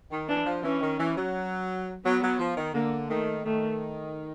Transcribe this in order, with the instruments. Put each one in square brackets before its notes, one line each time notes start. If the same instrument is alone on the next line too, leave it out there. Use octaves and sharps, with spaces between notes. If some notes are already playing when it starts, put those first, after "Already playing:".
[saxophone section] D#3
[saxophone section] E3 [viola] D4
[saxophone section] F3
[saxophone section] E3 [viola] C#4
[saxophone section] D#3
E3
F#3
[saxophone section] F#3 [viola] B3
[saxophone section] F#3
F3
D#3
[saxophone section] D3 [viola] A#3
[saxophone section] D#3 [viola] A3
[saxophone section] D#3 [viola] A3